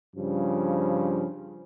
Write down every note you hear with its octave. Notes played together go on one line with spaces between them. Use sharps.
G2 C#3 F3